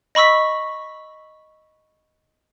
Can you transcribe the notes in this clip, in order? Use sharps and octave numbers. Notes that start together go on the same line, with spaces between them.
D#5 B5 C#6 E6 B6